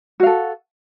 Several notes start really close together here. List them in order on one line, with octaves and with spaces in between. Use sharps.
F#4 F5 A4